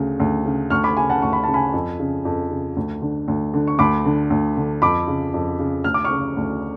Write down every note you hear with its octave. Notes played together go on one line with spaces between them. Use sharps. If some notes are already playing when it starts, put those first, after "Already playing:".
Already playing: D2 C#3
D2
C#3
D2 C#6 F6
B5 D6
C#3 G#5 B5
F#5 A5
D2 C#6
B5
C#3 A5
G#5 B5
F2
C#3
F2
C#3
D2
D3
D2
D3
C#6
D2 B5 D6
D3
D2
D3
F2 B5 D6
C#3
F2
C#3
D2 F6
D6
C#6 F6
C#3
D2